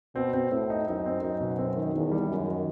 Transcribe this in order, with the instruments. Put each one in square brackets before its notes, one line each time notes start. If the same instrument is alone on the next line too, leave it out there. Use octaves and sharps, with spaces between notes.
[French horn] B2 [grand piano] C4
[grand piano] C4
[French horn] A2 [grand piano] C4
[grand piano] D#4
[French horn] F#2 [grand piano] D#4
[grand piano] C4
[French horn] F#2 [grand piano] D#4
[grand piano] B2
C4
D#3
[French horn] E2 [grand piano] D#3
[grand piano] G3
[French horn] F#2 [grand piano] D#3
[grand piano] D#3